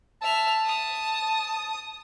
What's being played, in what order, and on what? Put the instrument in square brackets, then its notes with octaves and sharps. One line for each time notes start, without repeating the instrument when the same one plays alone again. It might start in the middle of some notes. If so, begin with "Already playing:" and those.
[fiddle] E5 F6 [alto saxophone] A5
[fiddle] D#6